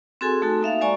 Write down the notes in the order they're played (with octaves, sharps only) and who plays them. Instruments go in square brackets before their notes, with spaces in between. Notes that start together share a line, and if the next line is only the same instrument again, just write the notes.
[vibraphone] C4 F#4 G#4 A4 G#5 C6
A3 D#4 F#4 A4
A#3 D#4 E5 F5
G#3 F#4 D5 G#5 A#5 C#6